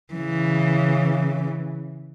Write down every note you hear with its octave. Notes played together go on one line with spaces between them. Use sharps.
C#3 E3